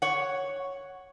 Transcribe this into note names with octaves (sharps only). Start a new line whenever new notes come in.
C#5 F#5